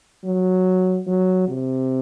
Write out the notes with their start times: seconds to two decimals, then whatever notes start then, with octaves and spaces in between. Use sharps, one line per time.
0.25 F#3
1.07 F#3
1.48 C3